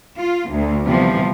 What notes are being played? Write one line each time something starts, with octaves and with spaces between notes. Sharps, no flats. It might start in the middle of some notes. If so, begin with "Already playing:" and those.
F4
D2
C3 E3 F3 G3 B3